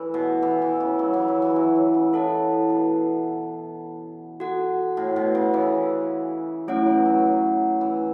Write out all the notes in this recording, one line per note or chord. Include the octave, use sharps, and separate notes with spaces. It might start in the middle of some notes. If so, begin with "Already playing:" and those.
Already playing: E3 E4 A4 C#5
B2
E3
E3
C#3
F#3
E3
F#3
E3
F#3
E3
C#3
E4 A4 F#5 A5
B2
F#4 A4 F#5
A2
B2
C#3
E3
F#3 A3 C#4 E4 C#5 F#5
E3
F#3
E3